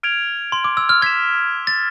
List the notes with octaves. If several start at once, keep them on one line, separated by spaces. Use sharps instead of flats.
F6 G#6 D7 F7
C6
D6
E6
F6
F6 G#6 B6 E7
A6